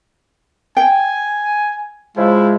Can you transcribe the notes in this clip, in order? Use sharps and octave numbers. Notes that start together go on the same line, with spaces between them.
G5 G#5
C#3 F3 G#3 E4